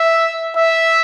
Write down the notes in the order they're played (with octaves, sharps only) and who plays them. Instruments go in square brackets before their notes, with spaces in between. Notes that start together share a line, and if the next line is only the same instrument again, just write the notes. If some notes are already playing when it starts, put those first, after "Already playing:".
Already playing: [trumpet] E5
E5